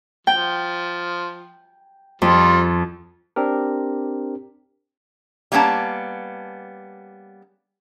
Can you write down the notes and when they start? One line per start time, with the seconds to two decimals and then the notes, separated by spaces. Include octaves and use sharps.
0.27 F3 G5
2.22 F2 F3 G3
3.36 C4 D4 G4 A#4
5.52 G3 A#3 B3 C#4 A5